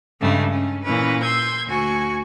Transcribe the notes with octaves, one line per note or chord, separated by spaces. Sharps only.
G2 C#3 G#3 A3 D4
C#4
A#2 E3 C#4 B4
C6 E6 G6 G#6
D2 F#4 G#5 C#6